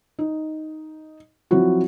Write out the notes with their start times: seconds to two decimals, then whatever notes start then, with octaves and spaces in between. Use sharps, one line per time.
0.19 D#4
1.51 F3 F#3 C4 E4 F#4